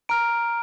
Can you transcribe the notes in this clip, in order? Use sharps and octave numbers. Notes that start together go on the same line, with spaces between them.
A#5 F6 D7